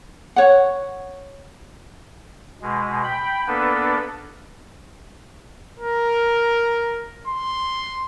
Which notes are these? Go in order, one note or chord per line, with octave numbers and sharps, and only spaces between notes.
C#5 F#5
B2 G#3
G5 B5
A#3 B3 D4 A4 B4
A#4
C6